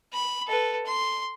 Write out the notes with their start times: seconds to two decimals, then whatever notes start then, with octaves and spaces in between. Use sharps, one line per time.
0.13 B5
0.47 A4 B4
0.86 C6